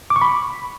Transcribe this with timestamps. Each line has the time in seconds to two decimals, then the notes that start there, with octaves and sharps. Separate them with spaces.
0.10 D6
0.16 C#6
0.22 B5